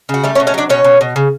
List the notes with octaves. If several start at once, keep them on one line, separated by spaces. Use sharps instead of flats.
C#3 F#4
G3 A3 G4
C#4 C#5
B2
C#4 C#5
F#3 D4 D5
B2 C#4 C#5
B2
B2
C#3